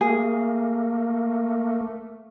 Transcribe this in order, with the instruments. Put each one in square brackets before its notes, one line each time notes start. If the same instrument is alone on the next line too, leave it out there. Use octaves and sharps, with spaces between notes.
[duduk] A3 [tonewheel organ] A#3 [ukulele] G#4